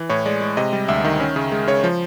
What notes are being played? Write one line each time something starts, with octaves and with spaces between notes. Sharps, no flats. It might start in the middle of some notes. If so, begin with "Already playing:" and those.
Already playing: E3
A2 C#5
G#3 D5
G#3
C3 D#5
G3
D2 E5
D#3
C#4
C#3
G#3
C#3 C#5
F3